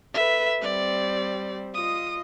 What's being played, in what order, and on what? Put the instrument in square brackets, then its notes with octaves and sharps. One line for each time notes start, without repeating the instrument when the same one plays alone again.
[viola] A4 B4 [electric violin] E5
[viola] G3 C4 [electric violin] D5
[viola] F4 D#5 [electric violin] D#6